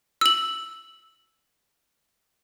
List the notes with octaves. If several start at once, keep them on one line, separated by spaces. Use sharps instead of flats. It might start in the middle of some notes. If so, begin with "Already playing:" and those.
E6 F#7